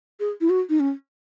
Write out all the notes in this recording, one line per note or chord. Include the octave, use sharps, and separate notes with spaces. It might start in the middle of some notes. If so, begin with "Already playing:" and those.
G#4
E4
F#4
D#4
C#4